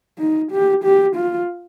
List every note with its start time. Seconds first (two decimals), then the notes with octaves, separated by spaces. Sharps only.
0.19 D#4
0.51 G4
0.84 G4
1.16 F4